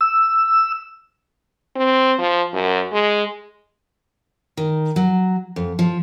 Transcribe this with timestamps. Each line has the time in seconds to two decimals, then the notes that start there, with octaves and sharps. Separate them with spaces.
0.01 E6
1.76 C4
2.19 F3
2.53 F#2
2.93 G#3
4.57 D#3
4.96 F#3
5.56 F2
5.79 F3